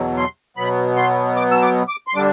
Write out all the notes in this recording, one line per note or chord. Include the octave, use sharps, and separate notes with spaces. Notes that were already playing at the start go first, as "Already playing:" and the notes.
Already playing: E2 B2 F#3
C6
B2 F#3 B3 B5
C6
D6
E6
D6
D6
C6
D3 G3 D4 D6